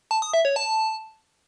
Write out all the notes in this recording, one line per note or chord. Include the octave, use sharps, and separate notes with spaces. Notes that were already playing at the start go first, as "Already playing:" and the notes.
A5
D#6
E5
C#5
A5